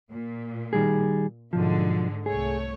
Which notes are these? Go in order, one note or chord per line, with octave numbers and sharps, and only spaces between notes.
A#2
D#3 G3 G#4
B1 G#2 D3 F3 G#3
C2 A3 G#4 C#5